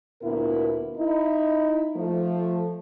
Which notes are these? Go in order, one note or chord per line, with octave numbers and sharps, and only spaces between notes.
D2 A#2 B3 E4 A#4
D#4 E4
F3 A3